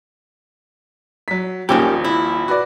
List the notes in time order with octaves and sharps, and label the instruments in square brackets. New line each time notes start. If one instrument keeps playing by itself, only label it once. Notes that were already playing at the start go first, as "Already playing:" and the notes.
[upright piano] F#3 B6
[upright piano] D#1 A#1 [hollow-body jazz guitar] D#3 C#4 G4
[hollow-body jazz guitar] E4
[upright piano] F#4 B4 D5